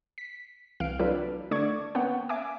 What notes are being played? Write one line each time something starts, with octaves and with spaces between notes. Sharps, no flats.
B6
C2 E3 F5 F6 D7
F#3 D4 E4 F4 A4 B4
D3 A3 D5 C#6 D6 G#6
A#3 B3 C#4 C#5 F#5 G5
E5 G#5 D6